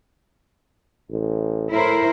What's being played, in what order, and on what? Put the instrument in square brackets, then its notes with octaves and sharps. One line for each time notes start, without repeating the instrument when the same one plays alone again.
[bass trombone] A1
[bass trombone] A2 [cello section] E4 A#4 C5